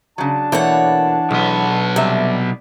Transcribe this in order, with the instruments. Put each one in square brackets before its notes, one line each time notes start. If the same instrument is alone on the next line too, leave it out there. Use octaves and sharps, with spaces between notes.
[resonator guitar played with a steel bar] C#3 F#3 [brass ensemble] D4 A5
[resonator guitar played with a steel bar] B2 A3 A#3 [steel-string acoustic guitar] E3 C#5 F#5
[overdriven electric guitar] B1 B3 [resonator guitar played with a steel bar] G#3
[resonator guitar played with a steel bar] C3 E5 [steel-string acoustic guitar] G3